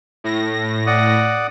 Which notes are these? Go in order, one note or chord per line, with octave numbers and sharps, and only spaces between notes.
A2 A#6
D5 F#5 D#6